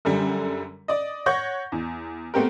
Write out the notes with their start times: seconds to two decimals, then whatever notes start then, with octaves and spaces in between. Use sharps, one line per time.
0.05 F#2 D3 G3
0.88 D5 D#5
1.26 C#5 F#5 C#6 G6 A#6
1.72 E2
2.34 A3 B3 C4 G4 A#4